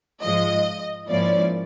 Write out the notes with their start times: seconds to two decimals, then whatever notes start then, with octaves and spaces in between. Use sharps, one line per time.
0.22 G#2 F3 G#3 D#5
1.08 G#2 F3 A#3 C#4 E4 D5